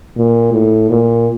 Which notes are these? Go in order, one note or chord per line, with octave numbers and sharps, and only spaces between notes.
A#2
A2
A#2